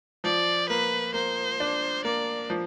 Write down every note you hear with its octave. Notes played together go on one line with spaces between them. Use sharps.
F3 D5
A#3 B4
A#3 C5
D4
A#3 D5
F3